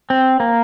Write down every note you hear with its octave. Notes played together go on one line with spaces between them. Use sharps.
C4
A#3